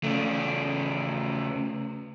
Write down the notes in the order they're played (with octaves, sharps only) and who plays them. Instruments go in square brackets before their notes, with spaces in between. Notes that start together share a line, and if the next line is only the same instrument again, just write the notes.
[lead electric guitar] C#3 A3